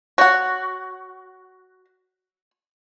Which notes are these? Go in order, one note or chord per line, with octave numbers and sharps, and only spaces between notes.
F#4 C#5 F#5